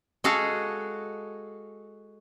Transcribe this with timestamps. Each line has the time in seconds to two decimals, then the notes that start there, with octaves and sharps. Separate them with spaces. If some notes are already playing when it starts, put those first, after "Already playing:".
0.24 G#3 F#4 G#4 A4 F5